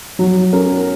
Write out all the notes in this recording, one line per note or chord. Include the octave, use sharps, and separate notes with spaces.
F#3
C#4 A#4